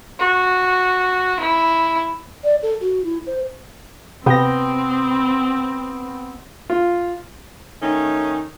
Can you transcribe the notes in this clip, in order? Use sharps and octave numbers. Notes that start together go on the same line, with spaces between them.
F#4
E4
D5
A4
F#4
E4
C5
C3 B3 C4 G5 A#6
F4
D#3 A3 C#4 D#4